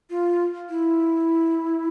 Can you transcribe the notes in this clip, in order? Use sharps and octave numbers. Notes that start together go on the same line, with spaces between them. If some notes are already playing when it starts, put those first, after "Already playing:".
F4
E4